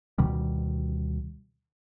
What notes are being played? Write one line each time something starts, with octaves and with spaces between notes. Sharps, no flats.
D2 B2 D#3 G3